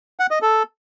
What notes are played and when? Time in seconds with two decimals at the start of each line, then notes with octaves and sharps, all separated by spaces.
0.19 F#5
0.31 D#5
0.42 A4